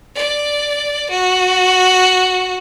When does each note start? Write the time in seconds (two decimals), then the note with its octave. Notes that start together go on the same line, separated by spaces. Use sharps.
0.16 D5
1.10 F#4